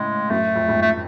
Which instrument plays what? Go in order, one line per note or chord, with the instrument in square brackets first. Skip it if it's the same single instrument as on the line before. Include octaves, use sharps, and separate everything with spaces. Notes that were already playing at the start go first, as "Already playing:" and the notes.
Already playing: [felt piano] A2 C#3 [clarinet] G#3
[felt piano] F#2 A2 [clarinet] A3
[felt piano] F2
F2 G#2
[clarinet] A3